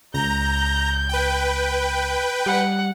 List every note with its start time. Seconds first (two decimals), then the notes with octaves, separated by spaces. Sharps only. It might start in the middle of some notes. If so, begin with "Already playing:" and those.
0.14 C#2 A#5 G6
1.09 B4 G5
2.46 G3 F#5